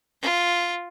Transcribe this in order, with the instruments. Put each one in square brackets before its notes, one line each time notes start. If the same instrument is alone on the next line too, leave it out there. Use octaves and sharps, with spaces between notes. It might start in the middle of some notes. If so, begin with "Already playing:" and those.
[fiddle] F4